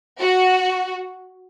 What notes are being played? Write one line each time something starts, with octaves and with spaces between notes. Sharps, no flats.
F#4